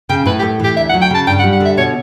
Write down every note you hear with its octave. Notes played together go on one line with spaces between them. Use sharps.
C#3 G5
A2 B4
G4
A3
E3 G4
D2 E5
F#5
F#3
G5
C#3 A5
G2 G5
F#5
G3
F#5
D3 E5
B2 C#5